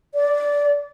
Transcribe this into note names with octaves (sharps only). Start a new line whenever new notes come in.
D5